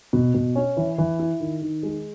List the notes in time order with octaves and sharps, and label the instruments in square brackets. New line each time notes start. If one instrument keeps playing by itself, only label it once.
[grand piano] B2
B2
C#4
E3
E3
E4
D#3
D#3
G#3